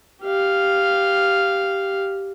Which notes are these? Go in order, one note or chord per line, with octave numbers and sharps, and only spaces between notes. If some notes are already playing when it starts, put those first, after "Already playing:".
G4 F5